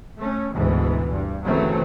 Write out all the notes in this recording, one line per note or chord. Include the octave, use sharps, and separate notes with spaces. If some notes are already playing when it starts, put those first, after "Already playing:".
A3 C#4
D2 G#2 B2 E3
G2
G1 C#3 E3 F#3 A3 C4